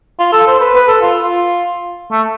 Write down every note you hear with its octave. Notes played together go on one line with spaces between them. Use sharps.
F4
A4
C5
B4
B4
A4
F4
F4
A3